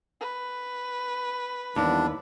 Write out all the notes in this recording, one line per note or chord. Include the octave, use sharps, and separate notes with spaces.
B4
D#2 E3 G3 B3 D4